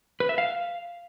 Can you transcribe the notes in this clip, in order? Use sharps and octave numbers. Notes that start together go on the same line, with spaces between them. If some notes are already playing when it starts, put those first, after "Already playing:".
B4
E5
F5